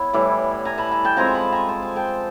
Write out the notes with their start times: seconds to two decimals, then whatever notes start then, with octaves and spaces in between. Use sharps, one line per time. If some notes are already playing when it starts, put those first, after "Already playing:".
Already playing: B3 E4 C#5
0.13 A2 E3 G3
0.65 G#5 A#5
0.78 A5 B5
0.91 G#5 A#5
1.05 G5 A5
1.17 F3 G#3 C4 G#5 A#5
1.27 A#5
1.34 A5 B5
1.52 G#5 A#5
1.69 A5
1.83 G#5
1.96 G5 A5